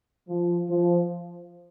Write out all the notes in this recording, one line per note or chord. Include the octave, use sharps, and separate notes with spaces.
F3
F3